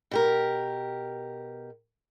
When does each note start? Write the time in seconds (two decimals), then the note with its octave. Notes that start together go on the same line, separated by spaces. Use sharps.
0.11 B2 G4 A#4